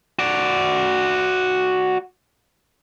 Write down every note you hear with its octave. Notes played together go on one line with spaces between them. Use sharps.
F#4 D5